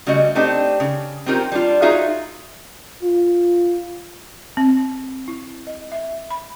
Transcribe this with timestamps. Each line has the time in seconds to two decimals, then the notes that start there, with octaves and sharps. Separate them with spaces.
0.07 C#3 G3 A3 F#4 D#5
0.35 A3 C4 D4 D#4 G4
0.80 C#3
1.26 C4 C#4 D#4 F4 G4 A#4
1.52 G3 D4 F4
1.82 D#4 F4 F#4 G#4 E5 F5
3.02 F4
4.57 C4
5.28 E4
5.67 D#5
5.92 E5
6.30 B5